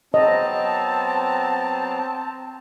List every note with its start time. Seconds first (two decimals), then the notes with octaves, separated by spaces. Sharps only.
0.14 F#3 B3 C4 D#5 A5 A#5